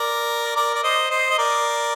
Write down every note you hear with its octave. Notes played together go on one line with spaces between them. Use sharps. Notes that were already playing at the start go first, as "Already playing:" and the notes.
Already playing: A#4 D5
A#4 D5
D5
C5 D#5
C5 D#5
D#5
A#4 D5